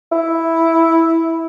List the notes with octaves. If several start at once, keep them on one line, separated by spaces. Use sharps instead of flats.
E4